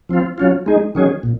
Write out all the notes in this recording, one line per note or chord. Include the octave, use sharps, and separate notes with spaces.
F3 C4 F4
F#3 C#4 F4
G#3 D#4 G#4
D#3 F#3 C#4 G#4
A#2